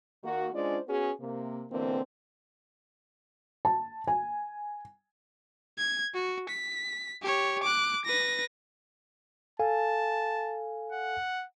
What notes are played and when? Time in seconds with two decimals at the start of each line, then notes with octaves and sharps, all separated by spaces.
0.23 D#3 A#3 F#4
0.54 G#3 C#4 D4 F4 C5 D5
0.88 B3 C#4 F#4 G#4
1.20 C3 A#3
1.71 B2 D3 E3 A#3 C4
3.65 A5
4.07 G#5
5.78 G#6
6.14 F#4
6.49 B6
7.22 G4 C#5
7.63 D6 F#6
8.05 B4 A#6
9.60 A4 F5 G#5 A5
10.92 F#5